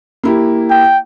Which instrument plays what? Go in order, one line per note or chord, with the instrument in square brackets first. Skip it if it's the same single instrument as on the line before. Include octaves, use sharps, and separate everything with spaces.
[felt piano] A#3 E4 G4
[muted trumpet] G5